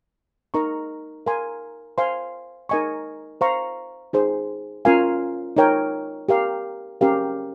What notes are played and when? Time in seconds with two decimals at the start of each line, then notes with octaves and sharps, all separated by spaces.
0.54 D#4 A#4 D#5 A#5 C#6
1.26 A#4 F5 G#5 C6
1.98 C5 F5 G#5 C6
2.69 D#4 A#4 D#5 G#5 C#6
3.41 C5 F5 A#5 C#6
4.13 D#4 G#4 C5
4.85 C#4 F4 A#4 F5 G#5
5.57 D#4 A#4 C#5 G5
6.29 G4 A#4 F5
7.01 C#4 G4 A#4 F5